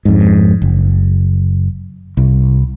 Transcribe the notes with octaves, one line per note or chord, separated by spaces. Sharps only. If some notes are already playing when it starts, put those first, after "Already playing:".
F2 G#2
F#1
C2